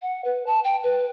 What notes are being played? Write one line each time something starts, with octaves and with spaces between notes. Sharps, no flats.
F#5
B4
A5
G5
B4